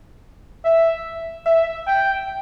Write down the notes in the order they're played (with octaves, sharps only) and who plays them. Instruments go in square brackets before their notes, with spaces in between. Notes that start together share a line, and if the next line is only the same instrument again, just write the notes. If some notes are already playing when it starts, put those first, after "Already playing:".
[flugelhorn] E5
E5
G5